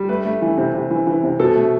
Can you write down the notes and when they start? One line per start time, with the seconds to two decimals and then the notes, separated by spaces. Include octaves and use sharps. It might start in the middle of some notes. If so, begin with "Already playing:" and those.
Already playing: G3
0.09 A3 B4
0.25 A3
0.42 E3
0.58 C3
0.74 C3
0.91 E3
1.07 E3
1.24 C3
1.40 B2 A4
1.56 A3